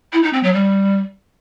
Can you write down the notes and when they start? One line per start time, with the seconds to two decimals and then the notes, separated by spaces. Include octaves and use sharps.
0.12 E4
0.23 D#4
0.33 C4
0.43 F#3
0.53 G3